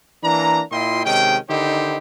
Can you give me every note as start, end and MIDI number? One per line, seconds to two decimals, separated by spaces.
0.24 0.62 52
0.24 0.62 58
0.24 0.62 62
0.24 0.62 82
0.71 1.02 46
0.71 1.02 64
0.71 1.02 65
0.71 1.02 75
0.71 1.02 79
0.71 1.02 84
1.05 1.37 48
1.05 1.37 51
1.05 1.37 56
1.05 1.37 61
1.05 1.37 79
1.49 1.98 50
1.49 1.98 51
1.49 1.98 63
1.49 1.98 64
1.49 1.98 67
1.49 1.98 72